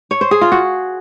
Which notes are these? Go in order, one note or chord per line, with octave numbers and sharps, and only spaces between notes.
C#5
C5
G#4
F4
F#4